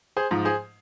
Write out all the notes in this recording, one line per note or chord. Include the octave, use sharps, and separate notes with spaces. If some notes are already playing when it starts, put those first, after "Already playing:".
G#4 C5
G#2 F3
G#4 C5